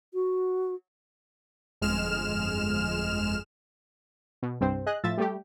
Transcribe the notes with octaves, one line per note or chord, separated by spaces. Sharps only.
F#4
G1 F2 G#3 F6 E7
B2
C2 G2 C4 C5
G#4 D#5 F#6
A2 F3 E5 A6
G3 A3 G4